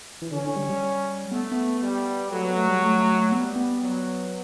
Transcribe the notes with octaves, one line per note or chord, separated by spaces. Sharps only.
E3
D3 C#4
D3
G3
G3
A3 B3
B3
G3
F#3 A3
B3
A3
G3
A3
A3
A3
G3 B3
B3
F#3